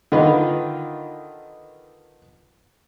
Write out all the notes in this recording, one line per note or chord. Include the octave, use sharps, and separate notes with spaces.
D3 D#3 D#4 F4 B4